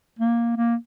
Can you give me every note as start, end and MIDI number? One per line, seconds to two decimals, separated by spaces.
0.19 0.56 58
0.57 0.76 58